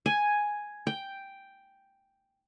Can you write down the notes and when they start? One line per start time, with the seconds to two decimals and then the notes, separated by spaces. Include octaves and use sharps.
0.06 G#5
0.87 G5